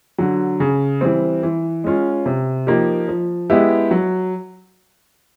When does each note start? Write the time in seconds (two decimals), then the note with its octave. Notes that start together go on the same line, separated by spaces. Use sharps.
0.18 D3 F#3
0.60 C#3
1.01 E3 G3 C4
1.43 E3
1.84 G#3 C#4 F4
2.26 C3
2.67 F3 A#3 D#4 G4
3.08 F3
3.50 G#3 B3 E4 G4
3.91 F#3